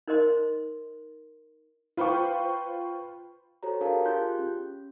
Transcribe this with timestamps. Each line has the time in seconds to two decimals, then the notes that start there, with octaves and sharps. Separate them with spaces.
0.08 D#4 A#4 C5 D#5 C6
1.97 F4 B4 C5 G5 C#6
3.63 F#4 G4 A4 C5 C#5 A#5
3.81 D4 G4 G#4 A#4 F5 A5
4.05 F4 G4 G#4 C6 F#6 G6
4.39 C#4